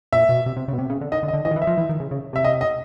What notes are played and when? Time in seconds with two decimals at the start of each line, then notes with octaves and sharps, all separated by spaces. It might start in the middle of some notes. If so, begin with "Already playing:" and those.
0.13 A#2 E5
0.29 B2
0.46 C3
0.57 C3
0.68 C#3
0.73 B2
0.78 C3
0.90 C#3
1.01 D3
1.12 D#3 D#5
1.23 D3
1.28 D#5
1.34 D3
1.45 E3 D#5
1.51 D#3
1.56 E3
1.62 E5
1.67 F3
1.78 E3
1.89 D#3
2.00 C#3
2.11 C#3
2.33 C3 E5
2.44 D#5
2.61 D#5